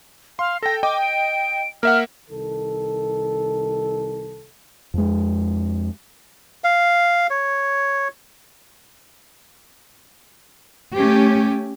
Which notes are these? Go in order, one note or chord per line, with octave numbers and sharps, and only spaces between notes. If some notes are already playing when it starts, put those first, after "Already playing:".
F5 C6
A4 G5 A#6
D#5 G5 D6
D7
A#3 E5 F#5 F6
C2 D#3 A4
F2 G#3
F5
C#5
A3 C#4 G4